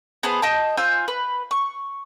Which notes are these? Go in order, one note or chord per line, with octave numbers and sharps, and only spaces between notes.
B3 G#4 C5 A5
D#5 G5 A5
F4 C5 G#5 E6
B4
C#6